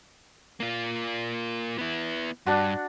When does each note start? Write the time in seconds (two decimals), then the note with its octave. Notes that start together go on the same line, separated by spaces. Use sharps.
0.60 A#3 F4
1.78 B3 E4
2.46 G2 D4 F#4